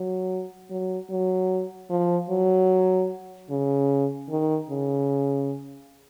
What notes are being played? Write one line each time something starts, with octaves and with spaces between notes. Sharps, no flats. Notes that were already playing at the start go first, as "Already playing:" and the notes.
Already playing: F#3
F#3
F#3
F3
F#3
C#3
D#3
C#3